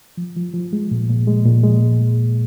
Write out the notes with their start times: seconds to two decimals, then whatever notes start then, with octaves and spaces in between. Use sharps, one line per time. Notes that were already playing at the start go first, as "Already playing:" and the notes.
0.17 F3
0.37 F3
0.54 F3
0.73 G#3
0.91 A#2
1.09 A#2
1.27 G#3
1.46 A#2
1.63 G#3